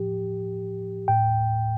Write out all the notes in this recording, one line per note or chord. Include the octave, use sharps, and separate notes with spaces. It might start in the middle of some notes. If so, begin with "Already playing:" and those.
Already playing: A2 F3 G4
A2 G5